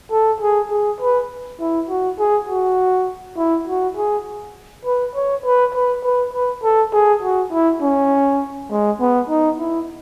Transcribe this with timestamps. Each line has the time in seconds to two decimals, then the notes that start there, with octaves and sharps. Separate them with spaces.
0.12 A4
0.41 G#4
0.71 G#4
1.01 B4
1.60 E4
1.89 F#4
2.19 G#4
2.49 F#4
3.37 E4
3.68 F#4
3.97 G#4
4.85 B4
5.15 C#5
5.45 B4
5.75 B4
6.04 B4
6.34 B4
6.63 A4
6.93 G#4
7.23 F#4
7.52 E4
7.82 C#4
8.71 G#3
9.00 B3
9.30 D#4
9.59 E4